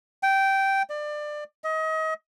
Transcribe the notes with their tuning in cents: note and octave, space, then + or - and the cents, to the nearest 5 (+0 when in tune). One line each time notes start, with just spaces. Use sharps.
G5 -10
D5 +25
D#5 +30